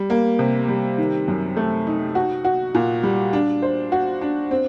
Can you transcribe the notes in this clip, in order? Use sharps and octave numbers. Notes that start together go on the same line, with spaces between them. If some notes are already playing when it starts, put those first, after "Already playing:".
Already playing: G3
A#3
C3
G3
D#3
F#2
A3
D#4
F#4
F#4
A#2
G3
D4
C5
F#4
D4
C4